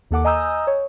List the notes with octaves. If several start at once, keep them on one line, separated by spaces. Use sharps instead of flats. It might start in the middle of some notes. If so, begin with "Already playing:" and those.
D#2 A#3 A4 F#5 D6
D#5 G#5 A#5 D#6 E6 G6
C#5